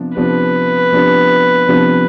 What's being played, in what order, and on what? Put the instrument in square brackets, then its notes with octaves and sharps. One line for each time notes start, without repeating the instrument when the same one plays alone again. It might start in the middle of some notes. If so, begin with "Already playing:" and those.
Already playing: [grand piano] C3 F3 B3 D4
[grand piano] C3 F3 B3 D4 G4 [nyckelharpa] B4
[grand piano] C3 F3 B3 D4 G4
C3 F3 B3 D4 G4